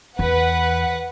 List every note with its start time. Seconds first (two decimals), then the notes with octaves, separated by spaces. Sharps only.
0.19 E2 B4 F#5